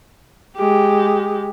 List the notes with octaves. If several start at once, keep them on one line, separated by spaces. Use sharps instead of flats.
G#3 G4